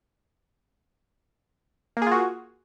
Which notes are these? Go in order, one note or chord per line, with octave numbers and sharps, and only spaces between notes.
A#3 F4 F#4 G#4